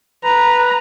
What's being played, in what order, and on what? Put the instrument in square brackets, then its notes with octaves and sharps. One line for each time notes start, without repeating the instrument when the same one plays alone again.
[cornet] B4 [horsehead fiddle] A#5